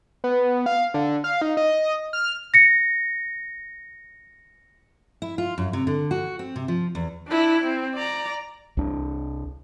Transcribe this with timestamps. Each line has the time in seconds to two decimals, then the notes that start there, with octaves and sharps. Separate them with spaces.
0.24 B3
0.66 F5
0.94 D3
1.24 F5
1.42 D#4
1.57 D#5
2.13 F6
2.54 A#6 C#7
5.22 E4
5.38 F4
5.58 F#2
5.73 C3
5.87 D3
6.11 F#4
6.39 C4
6.56 C3
6.68 F3
6.95 E2
7.28 D4 E4
7.64 C4
7.95 D5 A#5
8.77 C2 D4